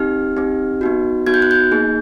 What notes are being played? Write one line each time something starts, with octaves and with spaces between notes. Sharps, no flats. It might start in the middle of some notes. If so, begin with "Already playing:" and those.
Already playing: C4 D#4 G4 F6
C4 D#4 G4
B3 D#4 F#4
B3 D#4 F#4 G#6
G6
F#6
G6
A#3 D#4 G#4